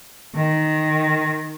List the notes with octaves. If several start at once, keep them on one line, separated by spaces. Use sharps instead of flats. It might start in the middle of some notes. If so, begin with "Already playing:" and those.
D#3